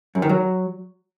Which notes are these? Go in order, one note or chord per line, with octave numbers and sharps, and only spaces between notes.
F#2
D#3
F#3